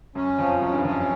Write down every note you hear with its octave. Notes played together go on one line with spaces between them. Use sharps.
F#2 C#4
F2 F3
F#2 C#4
G2
F2 C#4